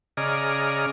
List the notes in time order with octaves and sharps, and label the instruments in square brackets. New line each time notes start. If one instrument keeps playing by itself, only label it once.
[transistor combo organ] C#3 G#4 D5 D#5 A#5 F6